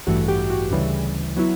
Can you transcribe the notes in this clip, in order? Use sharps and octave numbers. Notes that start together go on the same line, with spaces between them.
A1 G2 E3 A3 F#4
G4
F#4
D2 C#3 E3 G3
F#3 B3 E4